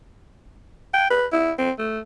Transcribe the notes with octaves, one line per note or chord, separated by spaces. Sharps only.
G5
B4
E4
C4
A3